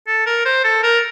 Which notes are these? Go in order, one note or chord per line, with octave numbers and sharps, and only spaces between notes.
A4
A#4
C5
A4
A#4